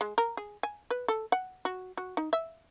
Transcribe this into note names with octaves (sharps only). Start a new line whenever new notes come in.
G#3
A#4
G#4
G#5
B4
A4
F#5
F#4
F#4
D#4
E5